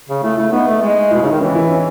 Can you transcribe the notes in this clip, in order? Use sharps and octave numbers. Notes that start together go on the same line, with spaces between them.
C#3
A3 E4
A3 E4
B3 D#4
A3
G#3
B2 E4
C#3 D#4
D#3
E3 C#4
E4
C#4